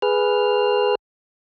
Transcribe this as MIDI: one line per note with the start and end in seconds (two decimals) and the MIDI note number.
0.02 0.95 68
0.02 0.95 71
0.02 0.95 89